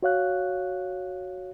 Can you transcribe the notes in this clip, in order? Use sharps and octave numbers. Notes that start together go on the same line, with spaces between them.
F#4 C#5 F5 F#6